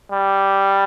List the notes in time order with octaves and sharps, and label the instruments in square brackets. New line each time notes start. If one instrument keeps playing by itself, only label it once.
[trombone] G3